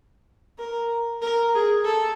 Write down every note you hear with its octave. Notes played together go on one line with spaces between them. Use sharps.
A#4
A#4
G#4
A4